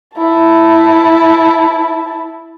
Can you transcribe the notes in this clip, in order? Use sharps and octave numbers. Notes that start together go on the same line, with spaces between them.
E4 A5